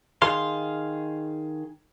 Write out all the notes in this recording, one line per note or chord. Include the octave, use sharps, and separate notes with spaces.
D#3 G#4 F5 C6